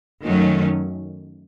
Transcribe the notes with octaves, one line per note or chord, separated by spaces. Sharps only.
F#2 D#3 F#3 A3 C#4